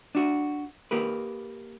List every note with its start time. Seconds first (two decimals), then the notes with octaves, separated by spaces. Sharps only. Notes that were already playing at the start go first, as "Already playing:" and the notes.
0.15 D4 F#4
0.91 A#3 G4 A#4 B4